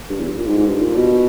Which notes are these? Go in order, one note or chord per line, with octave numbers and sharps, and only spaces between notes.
G2
E2
G2
A#2
G#2
G#2
G2
A#2
B2